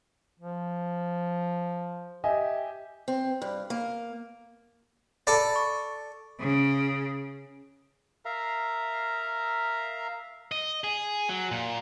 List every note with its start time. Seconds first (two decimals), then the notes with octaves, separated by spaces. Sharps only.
0.40 F3
2.24 G4 D#5 E5 G#5
3.08 C4
3.42 G2
3.70 A#3
5.27 A4 D5 A5 B5
5.56 C#6
6.40 C#3
8.25 A#4 E5 F5 A#5
10.52 D#5
10.84 G#4
11.29 F#3
11.51 A#2